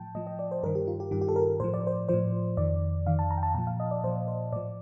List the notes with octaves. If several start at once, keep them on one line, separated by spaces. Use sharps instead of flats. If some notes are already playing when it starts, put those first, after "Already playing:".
Already playing: A2 F3 G5 A5
A2 F3 D#5
D#5
D5
C5
G2 D#3 A#4
G4
F4
G4
G2 D#3 G4
G4
A4
A#4
A2 F3 C5
D5
C5
A2 F3 C5
F2 D#3 D5
F2 D#3 F5
A5
A#5
G5
A5
A#2 F3 A5
F5
D#5
D5
A#2 F3 C5
C5
A2 F3 D5